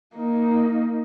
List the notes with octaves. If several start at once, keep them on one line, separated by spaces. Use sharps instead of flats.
A#3 D#4